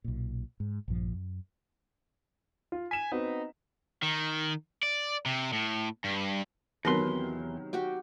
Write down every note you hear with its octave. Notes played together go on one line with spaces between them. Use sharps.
B1 A#2
G#2
A#1 G2 E3 F3
F#2
F4
G#5 B6 E7
B3 C4 D#4 F#4
D#3
D5
C3
A2
G2
E2 C3 D#3 F#3 B3 A#4 B4 C6
F#4 G4 G5